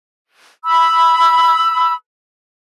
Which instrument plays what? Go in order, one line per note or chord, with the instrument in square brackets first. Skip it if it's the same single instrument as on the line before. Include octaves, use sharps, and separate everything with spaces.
[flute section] B5 E6